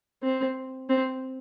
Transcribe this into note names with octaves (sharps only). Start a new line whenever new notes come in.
C4
C4